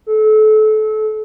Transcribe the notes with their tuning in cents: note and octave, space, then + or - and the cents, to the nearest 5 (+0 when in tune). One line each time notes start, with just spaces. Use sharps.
A4 -30